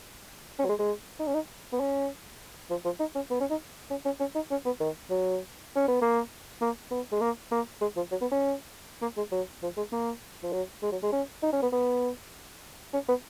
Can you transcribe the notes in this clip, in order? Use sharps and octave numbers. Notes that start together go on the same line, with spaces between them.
C#4
F#3
G#3
G#3
D#4
C#4
D#4
B3
C#4
F3
F3
D#4
C#4
B3
C#4
D#4
C#4
C#4
C#4
D#4
C#4
B3
D#3
F#3
C#4
B3
A#3
A#3
B3
G#3
A#3
A#3
G#3
F3
F#3
B3
C#4
A#3
G#3
F#3
F3
G#3
A#3
F3
F#3
G#3
F#3
G#3
C#4
D#4
C#4
B3
B3
C#4
B3